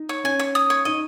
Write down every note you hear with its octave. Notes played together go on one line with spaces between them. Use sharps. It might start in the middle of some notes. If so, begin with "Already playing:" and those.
Already playing: D#4
C#5
C#4 G#5
C#5
D#6
C#5
D#4 D#5